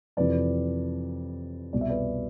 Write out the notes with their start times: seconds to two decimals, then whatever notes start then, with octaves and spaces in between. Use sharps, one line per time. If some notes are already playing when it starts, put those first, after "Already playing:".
0.17 F2 C3 E3 B4 D5
1.73 C2 B2 D5
1.81 E5
1.90 B4 D5